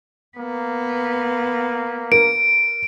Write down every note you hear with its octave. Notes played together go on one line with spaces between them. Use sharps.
A#3 B3
A#4 D7